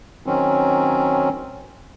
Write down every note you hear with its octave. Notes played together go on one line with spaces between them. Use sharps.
D#3 F#3 C4 C#4